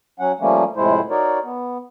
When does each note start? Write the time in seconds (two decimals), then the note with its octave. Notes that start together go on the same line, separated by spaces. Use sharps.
0.19 F#3 C#4 F#5
0.40 F3 G3 A3 A#3 C#4
0.76 F2 A2 C3 G#3 E4 C5
1.10 D#4 F#4 A#4 C#5 D5
1.43 B3